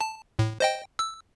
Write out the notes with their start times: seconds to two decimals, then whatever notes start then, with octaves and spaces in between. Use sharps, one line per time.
0.01 A5
0.39 A2
0.60 C5 D#5 G5
0.99 E6